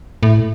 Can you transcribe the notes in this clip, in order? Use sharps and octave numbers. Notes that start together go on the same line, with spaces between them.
A2